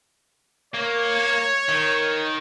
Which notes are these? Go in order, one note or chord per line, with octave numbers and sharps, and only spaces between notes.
A#3 C#5
D#3